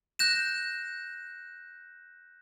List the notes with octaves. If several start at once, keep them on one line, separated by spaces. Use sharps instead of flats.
F#6 G6 A#6 E7